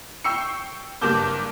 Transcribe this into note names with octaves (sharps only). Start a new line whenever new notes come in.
G5 C#6 E6 C7 C#7
F#1 G2 A#3 A5 D6 G6